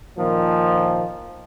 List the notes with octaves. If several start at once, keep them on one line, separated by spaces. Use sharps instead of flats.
A#2 D#3 F3